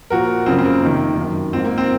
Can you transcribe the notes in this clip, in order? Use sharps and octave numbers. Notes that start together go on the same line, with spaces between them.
A#2 F3 F#4 A#4
F#2 C#3 F3 C4
C4
A#3
F2 C3 D#3
F#2 D#3
G#2 F3 C4
A#3
C4